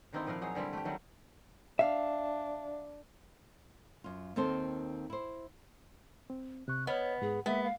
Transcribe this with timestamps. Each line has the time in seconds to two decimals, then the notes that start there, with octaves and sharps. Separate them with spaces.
0.13 D3 D#3 A#3 C4 D#4 E4
0.26 A#2 F3 E4 A#4 F5
0.41 F#3 D#4 G#4 C#5
0.55 D3 G3 C4 E4
0.73 A3 G4
0.85 D#3 F#3 G3 E4
1.79 D4 E5 F5
4.04 F#2 F4
4.36 D#2 D#3 C4 A4 C5
5.10 E4 C5
6.30 C4
6.68 C3 C#6 F#6
6.87 B3 C#5 D#5 B5 F6
7.22 G#2 G#4
7.46 G#3 A#3 B3 E5
7.64 F5